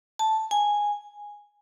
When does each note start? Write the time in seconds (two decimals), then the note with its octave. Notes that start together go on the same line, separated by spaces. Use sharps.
0.19 A5
0.51 G#5